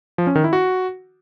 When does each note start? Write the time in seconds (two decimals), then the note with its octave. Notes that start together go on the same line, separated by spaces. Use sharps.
0.18 F3
0.27 C#4
0.35 D#3
0.44 E4
0.53 F#4